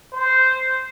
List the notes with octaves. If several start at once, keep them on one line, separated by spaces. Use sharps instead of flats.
C5